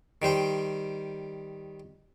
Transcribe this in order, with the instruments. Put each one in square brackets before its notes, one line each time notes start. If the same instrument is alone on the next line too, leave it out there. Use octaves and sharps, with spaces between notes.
[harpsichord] D#3 G3 C5 G5